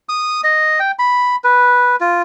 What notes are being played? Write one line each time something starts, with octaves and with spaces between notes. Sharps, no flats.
D#6
D#5
G5
B5
B4
F4